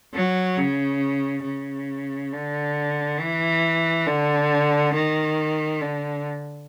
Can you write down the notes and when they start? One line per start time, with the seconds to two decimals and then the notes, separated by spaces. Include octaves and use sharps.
0.14 F#3
0.58 C#3
1.44 C#3
2.32 D3
3.20 E3
4.06 D3
4.94 D#3
5.81 D3